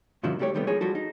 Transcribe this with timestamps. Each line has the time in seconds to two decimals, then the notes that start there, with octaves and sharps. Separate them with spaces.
0.23 G#2 C3 D#3 F3 F#3 E4
0.39 C#2 G3 A3 G4 C#5
0.54 C3 D#3 G3 A3 B3
0.67 F3 G#3 D#4 G#4 C#5
0.81 F3 G3 E4 F#4 A4
0.95 D#4